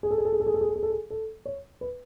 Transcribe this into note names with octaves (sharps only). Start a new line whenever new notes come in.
G#4
A4
G#4
A4
G#4
A4
G#4
A4
G#4
A4
G#4
A4
G#4
A4
C#5
B4